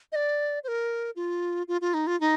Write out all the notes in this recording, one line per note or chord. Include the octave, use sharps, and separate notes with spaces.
D#5
D5
C5
A#4
F4
F4
F4
D#4
F4
D#4